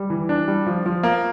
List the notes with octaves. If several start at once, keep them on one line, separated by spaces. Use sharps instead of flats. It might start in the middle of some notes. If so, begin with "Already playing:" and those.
Already playing: G3
E3
D4
G3
F3
F3
A#3